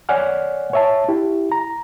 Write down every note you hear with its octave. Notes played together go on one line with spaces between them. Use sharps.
C#5 D5 F#5 G#5 F6
C#5 E5 A5
E4 G4
A#5